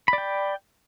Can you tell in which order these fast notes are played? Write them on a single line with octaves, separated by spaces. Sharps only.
B5 D5 G5